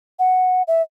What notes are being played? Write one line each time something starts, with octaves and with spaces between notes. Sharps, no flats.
F#5
E5